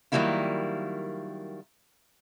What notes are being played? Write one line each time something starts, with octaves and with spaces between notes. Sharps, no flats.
D#3 F#3 G3 A#3 E4 F4